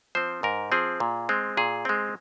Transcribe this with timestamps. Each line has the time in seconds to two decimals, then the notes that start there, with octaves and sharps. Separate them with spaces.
0.15 F3 C4 C5
0.43 G#2 A#4
0.72 F3 C4 G#4
1.00 A#2
1.29 G#3 C4
1.57 A#2 G#4
1.85 G#3 C4